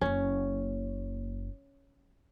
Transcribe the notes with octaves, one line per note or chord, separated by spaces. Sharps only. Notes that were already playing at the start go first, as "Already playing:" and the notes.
F#1 A#3 C#4